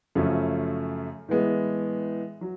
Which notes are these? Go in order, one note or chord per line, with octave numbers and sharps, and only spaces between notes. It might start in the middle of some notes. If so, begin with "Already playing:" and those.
F#2 C#3 F3 A3 C#4
A2 E3 G#3 B3
F#3